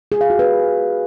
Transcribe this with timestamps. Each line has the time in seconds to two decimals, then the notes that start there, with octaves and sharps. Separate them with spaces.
0.12 G#4
0.21 F5
0.30 F#4
0.39 B4